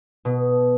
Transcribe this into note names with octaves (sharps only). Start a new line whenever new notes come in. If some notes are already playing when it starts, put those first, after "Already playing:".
B2